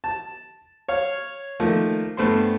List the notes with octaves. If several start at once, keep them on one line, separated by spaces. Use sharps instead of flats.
A5
C#5 F5
D#3 F3 A3 A#3
G2 A3 B3 C5 C6